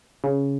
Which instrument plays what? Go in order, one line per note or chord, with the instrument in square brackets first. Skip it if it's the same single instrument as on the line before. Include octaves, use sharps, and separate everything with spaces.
[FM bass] C#3